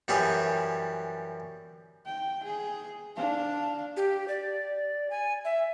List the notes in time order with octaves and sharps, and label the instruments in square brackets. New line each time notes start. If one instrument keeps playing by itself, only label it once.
[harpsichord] F#2 E3 G3 G4 G#4
[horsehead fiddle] G5
G#4
D4 F5
[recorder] G4
D5
G#5
E5